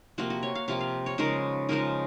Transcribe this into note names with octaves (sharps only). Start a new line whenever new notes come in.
C3 F3 A#3 F#4
F#4
C#5
F5
C3 F3 A#3 F5
F5
C#5
C#3 F3 G#3 D#4 A#4
C#3 F3 G#3 D#4 A#4